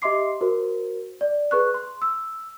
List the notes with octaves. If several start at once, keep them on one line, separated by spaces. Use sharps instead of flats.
G4 D#5 E5 C6 D6 C7
F#4 A#4 C5
D5
G#4 B4 C#6 F#6
C6
E6